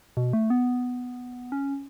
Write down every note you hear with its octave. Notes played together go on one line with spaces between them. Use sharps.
B2
A3
B3
C#4